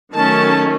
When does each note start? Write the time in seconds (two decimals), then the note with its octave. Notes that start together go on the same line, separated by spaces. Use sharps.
0.13 D#3 F#3 A3 C#4 A5